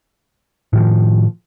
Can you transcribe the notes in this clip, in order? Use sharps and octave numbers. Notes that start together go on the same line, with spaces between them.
A2 D#3 F3